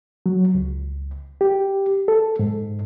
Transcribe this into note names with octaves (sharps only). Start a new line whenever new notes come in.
F#3
C#2
G4
A4
G#2